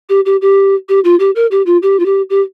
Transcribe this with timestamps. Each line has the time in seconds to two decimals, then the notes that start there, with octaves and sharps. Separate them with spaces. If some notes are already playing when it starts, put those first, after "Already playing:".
0.09 G4
0.26 G4
0.42 G4
0.89 G4
1.04 F4
1.20 G4
1.36 A#4
1.51 G4
1.66 F4
1.82 G4
2.00 F4
2.06 G4
2.30 G4